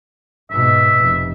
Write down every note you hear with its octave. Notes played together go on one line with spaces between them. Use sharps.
G#2 B2 E5
F1